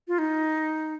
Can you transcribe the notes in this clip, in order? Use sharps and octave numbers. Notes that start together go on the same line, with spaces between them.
F4
D#4